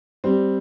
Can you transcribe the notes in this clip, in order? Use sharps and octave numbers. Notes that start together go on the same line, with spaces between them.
G3 C4